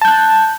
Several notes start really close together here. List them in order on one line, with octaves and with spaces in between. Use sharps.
A5 G6 F#6